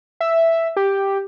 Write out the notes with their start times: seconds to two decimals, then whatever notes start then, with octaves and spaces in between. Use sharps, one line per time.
0.21 E5
0.77 G4